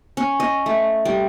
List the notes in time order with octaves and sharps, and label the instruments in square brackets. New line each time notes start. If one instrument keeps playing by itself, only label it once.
[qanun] C#4
D#5
A3
G3